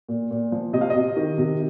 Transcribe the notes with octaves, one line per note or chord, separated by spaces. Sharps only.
A#2
A#2
F3
C3 D#5
F5
D#5
C3
D#3
C3